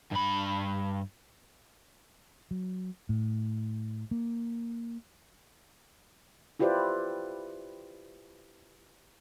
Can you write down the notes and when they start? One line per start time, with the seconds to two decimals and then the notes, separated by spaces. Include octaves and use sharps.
0.12 G2 B5
2.51 F#3
3.09 A2
4.11 A#3
6.59 E4 F4 G4 B4 C5 D5